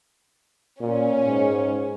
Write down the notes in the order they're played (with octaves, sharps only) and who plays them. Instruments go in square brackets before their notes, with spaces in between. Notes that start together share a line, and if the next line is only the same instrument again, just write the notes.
[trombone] A#2 [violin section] C#4
[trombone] G#2